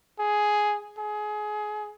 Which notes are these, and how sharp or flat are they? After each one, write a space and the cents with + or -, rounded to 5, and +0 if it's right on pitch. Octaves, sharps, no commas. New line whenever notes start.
G#4 +5
G#4 +25